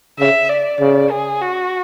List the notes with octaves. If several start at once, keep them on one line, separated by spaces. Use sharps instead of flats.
C#3 E5
D5
C#3
G#4
F#4